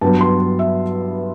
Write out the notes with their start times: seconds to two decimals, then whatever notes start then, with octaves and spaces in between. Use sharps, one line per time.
0.01 G2 F#3 B3 A5
0.21 C6
0.59 E5